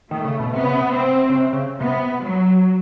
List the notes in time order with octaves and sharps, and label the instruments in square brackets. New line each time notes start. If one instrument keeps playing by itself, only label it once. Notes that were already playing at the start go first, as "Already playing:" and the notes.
[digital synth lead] D#3 [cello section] A3
[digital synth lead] C#3
B2
[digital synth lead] C3 [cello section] B3
[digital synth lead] C#3
C3
[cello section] C4
[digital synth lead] C#3
C3
C#3
[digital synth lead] C3 [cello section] B3
[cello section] F#3